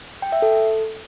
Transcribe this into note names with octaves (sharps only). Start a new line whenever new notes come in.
G5
E5
A4